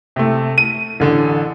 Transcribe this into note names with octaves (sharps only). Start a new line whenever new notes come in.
C3 A3
D#7
A1 D3